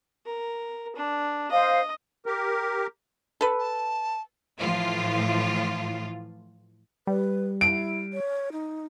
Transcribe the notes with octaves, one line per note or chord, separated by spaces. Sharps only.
A#4
D4
C5 D#5 F5
G4 A#4
A4 B4
A5
A2 E3 F3 F4
G3 B4
E4 D7
C#5
D#4